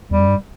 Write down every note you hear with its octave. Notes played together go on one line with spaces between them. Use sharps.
E2 G3
F#2
G2